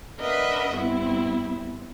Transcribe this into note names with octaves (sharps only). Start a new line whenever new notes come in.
D4 A#4 B4 D#5 E5 F#5
G2 B3 C4 E4